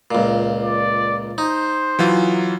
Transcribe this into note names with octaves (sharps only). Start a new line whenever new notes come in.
C#2 A#2
D5
D#4 C5
E3 F#3 F4